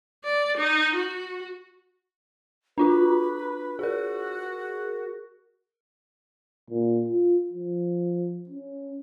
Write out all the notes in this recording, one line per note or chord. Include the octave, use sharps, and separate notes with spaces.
D5
D#4
F#4
D4 F4 F#4 B4
F#4 G#4 A#4
A#2
F4
F3
C#4